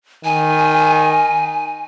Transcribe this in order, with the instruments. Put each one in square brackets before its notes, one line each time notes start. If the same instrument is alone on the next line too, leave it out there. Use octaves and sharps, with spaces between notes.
[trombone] D#3 [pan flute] G#5